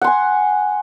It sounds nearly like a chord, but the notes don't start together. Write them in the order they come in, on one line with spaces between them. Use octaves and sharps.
F#5 C6 G#5